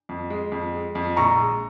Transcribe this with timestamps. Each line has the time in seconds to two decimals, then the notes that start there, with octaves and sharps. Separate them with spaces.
0.09 F2
0.30 G#3
0.52 F2
0.74 G#3
0.95 F2
1.17 A#1 A#5 C#6
1.39 G#3